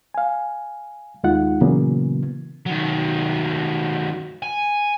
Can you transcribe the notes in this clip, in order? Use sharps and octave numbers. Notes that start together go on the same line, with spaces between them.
F5 G#5
D#2 G#3 D#4 F4 F#5
A#2 C#3 E3 F#3 A#3 B3
D#3 F#3
G#5